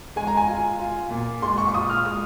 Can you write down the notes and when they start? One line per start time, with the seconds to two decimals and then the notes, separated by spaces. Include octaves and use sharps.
0.16 G#3 G#5
0.27 A#5
0.37 G#5
0.48 F4
0.79 F4
1.10 A#2
1.42 G#3 C6
1.58 C#6
1.68 C#6
1.74 F4 D#6
1.89 F6
2.05 G#3 D#6